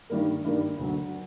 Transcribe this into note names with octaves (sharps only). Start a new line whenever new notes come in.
G2 D#3 G3 A#3
G2 D#3 G3 A#3
D2 D3 F#3